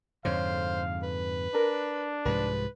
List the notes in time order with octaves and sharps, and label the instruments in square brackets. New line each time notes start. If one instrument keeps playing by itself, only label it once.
[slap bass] F2 G#2 D3 [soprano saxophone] C5 [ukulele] C#5 [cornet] F5
[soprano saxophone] B4
[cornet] D4 [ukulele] A#4
[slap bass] C2 G#2 F3 [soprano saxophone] B4